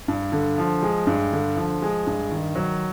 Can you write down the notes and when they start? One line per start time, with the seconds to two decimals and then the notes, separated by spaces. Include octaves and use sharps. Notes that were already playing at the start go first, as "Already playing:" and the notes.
0.08 G2
0.32 D3
0.58 F3
0.82 G#3
1.07 G2
1.32 D3
1.56 F3
1.82 G#3
2.07 G2
2.31 D#3
2.56 F#3